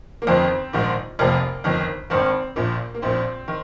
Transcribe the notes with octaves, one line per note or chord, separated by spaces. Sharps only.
A#3
G1 F2 D#3 C4
A#1 G#2 D#3
F1 F2 C3 A#3
G1 F2 D#3
G#1 G2 D#3 C4
A#1 A#2 A#3
A#3
A#1 A#2 C4
D#3